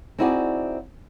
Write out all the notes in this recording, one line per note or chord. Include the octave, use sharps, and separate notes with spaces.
C4 D#4 E4 F#4 G#4 D5